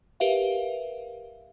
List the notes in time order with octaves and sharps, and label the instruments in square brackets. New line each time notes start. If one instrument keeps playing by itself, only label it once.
[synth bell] G4 A#4 B4 E5 F5